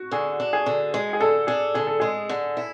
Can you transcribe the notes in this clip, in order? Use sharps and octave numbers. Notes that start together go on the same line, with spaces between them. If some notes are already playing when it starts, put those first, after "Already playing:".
Already playing: F#4
D3 G#4
D4
G#4
D3
G#3
G#4
D3 A4
D4 G#4
D3 G#4
A4
G#3 G#4
D3
E4